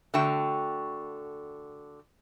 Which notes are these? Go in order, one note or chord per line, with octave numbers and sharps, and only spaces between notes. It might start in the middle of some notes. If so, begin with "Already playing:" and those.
D3 A3 F#4 G5